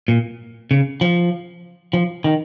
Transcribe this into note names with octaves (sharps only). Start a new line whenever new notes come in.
A#2
C#3
F3
F3
D#3